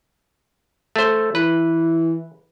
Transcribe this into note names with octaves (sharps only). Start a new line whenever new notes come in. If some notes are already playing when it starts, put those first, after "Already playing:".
A3 C5
E3 B4